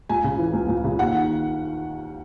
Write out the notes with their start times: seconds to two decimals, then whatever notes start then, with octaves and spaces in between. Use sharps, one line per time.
0.09 C#2 G#5
0.24 C#3
0.38 E3
0.53 C#2
0.68 C#2
0.84 C#3
0.99 D#2 F#5
1.14 D#3